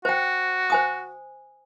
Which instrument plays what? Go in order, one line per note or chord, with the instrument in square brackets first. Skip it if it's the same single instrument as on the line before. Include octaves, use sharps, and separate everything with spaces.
[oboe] F#4 [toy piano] C5 G5
[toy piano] C5 G#5 D#6